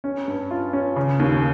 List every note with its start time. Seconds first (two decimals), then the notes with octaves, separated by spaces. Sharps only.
0.04 C#4
0.28 G2
0.51 F4
0.73 C#4
0.96 C#3
1.20 D#2